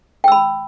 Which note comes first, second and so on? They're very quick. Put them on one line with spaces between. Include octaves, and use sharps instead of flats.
G5 E6 B5